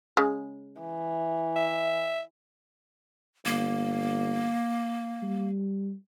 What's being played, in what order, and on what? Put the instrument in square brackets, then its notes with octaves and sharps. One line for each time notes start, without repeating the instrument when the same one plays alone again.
[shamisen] C#3 G#3
[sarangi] E3
[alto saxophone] E5
[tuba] G1 [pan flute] A#3
[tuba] G3